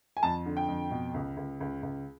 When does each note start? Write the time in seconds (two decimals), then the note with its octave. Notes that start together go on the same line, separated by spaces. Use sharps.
0.17 G#5
0.23 F2 A5
0.46 D3
0.57 G5
0.68 F2
0.91 B2
1.14 C#2
1.37 C#2
1.60 C#2
1.83 C#2